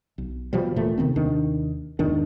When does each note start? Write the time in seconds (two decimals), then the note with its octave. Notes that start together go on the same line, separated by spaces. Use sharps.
0.18 B1
0.53 B2 F3 G3
0.76 D#1 A#2 E3 A3
0.98 C3 D#3 B3 C4
1.16 D#2 C3 D#3 D4
1.99 E2 G#2 D#3 D4